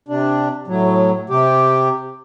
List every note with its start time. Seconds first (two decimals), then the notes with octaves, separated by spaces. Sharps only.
0.09 C3 D4
0.68 A2 F#3
1.30 C3 G4